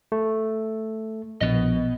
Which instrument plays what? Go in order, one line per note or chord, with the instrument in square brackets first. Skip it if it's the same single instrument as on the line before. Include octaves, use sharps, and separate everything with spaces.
[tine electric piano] A3
[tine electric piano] A#1 [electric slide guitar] B2 B3 D#5